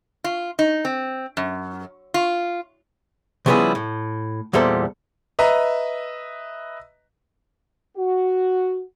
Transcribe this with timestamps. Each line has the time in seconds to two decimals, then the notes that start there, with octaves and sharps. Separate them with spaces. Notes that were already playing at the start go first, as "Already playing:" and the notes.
0.24 F4
0.59 D#4
0.85 C4
1.37 F#2
2.14 F4
3.46 C#3 F3 G3 B3 E4 G#4
3.75 A2
4.53 E2 A#2 G3 A4 C5
5.39 B4 D#5 E5 A#5
7.97 F#4